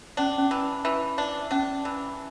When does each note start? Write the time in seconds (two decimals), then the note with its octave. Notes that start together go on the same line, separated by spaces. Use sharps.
0.17 C#4 D4
0.38 C#4
0.51 E3
0.85 E3
1.18 D4
1.51 C#4 D4
1.85 E3